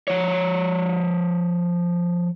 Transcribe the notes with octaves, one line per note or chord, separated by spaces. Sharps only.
F3 C#5